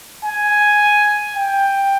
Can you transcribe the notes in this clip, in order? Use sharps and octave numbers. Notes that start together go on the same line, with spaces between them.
G#5
G5